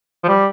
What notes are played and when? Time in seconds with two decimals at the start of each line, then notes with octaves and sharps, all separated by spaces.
0.24 F3
0.28 G3